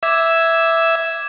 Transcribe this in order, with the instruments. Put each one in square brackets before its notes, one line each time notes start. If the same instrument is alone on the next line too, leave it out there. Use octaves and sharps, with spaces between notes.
[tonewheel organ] E5 E6 [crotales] D6 G#6 E7